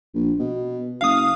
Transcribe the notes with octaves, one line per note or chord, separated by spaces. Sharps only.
A#1
B2
F#1 F5 D#6